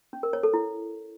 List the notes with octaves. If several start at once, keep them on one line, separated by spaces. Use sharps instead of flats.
C#4
A#4
C#5
A4
E4